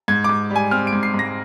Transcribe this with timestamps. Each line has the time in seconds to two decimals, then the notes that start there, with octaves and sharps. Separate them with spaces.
0.08 G#2 G#6
0.24 G#2 D6
0.50 G3
0.56 G#5
0.71 C4 F6
0.87 D7
0.93 G#2
1.03 C7
1.14 G#2 A#6